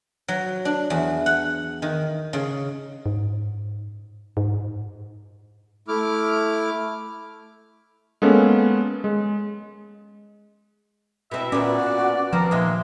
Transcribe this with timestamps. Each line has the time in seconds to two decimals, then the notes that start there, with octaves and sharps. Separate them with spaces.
0.28 F#3
0.65 D4
0.90 E2
1.26 F#5
1.82 D#3
2.33 C#3
3.06 G#2
4.37 G#2
5.88 A3 E4 D6 F6
8.22 G#3 A#3 B3 C#4 A4
9.04 G#3
11.31 B2 C4 E4 E5
11.52 A#2 B3 C#4 F#4 D5
12.33 F3 B3 C4 A#4
12.51 D#2 A#2 G#3 E5